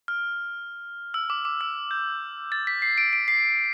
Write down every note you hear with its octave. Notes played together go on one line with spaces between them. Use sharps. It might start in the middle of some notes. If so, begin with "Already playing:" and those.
F6
E6
D6
D6
E6
G6
A6
B6
C7
D7
D7
C7